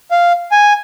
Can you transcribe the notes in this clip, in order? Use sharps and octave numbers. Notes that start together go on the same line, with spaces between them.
F5
G#5